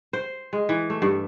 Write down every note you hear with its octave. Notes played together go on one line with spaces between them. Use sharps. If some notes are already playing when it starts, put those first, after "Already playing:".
C5
G#3
E3
A3
G2